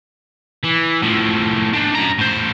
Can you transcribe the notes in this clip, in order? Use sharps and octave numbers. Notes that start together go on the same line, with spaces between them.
E3
A2 F3
D4 D#4
F#2 A#5
A2 C5